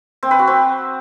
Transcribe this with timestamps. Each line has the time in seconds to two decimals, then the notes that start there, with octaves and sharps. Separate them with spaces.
0.23 C4
0.31 B4
0.39 F#4
0.47 C4